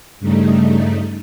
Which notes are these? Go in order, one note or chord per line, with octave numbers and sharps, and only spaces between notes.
G2 C#3 G3 A3 D#4